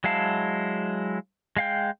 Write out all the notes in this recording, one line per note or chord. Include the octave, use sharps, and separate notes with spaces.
F#3 G#3 E4 F5 A5
G#3 F5 G5